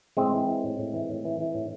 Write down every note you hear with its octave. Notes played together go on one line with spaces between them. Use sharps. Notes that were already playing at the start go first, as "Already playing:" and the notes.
A2 G#3 C4
E3
E3
A2
A2
E3
A2
E3
E3
A2